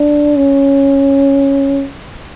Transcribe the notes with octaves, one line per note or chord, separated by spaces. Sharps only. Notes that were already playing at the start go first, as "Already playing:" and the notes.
Already playing: D4
C#4